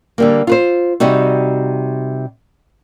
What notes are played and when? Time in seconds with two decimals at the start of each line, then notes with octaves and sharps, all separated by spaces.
0.18 D3 G3 A#3
0.47 F4 B4 C5
1.00 C3 G3 D#4 F#4